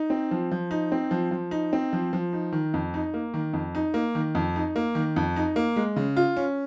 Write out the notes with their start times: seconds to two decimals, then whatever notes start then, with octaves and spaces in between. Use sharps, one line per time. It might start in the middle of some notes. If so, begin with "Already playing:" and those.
Already playing: D#4
0.10 C4
0.31 F3
0.51 F3
0.71 D#4
0.92 C4
1.11 F3
1.31 F3
1.51 D#4
1.73 C4
1.93 F3
2.13 F3
2.33 D#4
2.53 D#3
2.74 F2
2.94 D#4
3.14 A#3
3.34 D#3
3.53 F2
3.75 D#4
3.94 A#3
4.15 D#3
4.35 F2
4.56 D#4
4.76 A#3
4.95 D#3
5.16 F2
5.36 D#4
5.56 A#3
5.76 G#3
5.96 C#3
6.16 F4
6.37 C#4